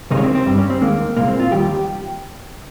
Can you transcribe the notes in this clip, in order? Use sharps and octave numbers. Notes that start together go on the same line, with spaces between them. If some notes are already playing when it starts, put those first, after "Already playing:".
C#2 C3 D#3 G#3 D#4
C#4
C4
C4
G2 G3
C#4
C4
D#2 D#3 G#3 A#3
C2 A#2 G#3 A#3
C4
F4
D#2 D#3 G3 G4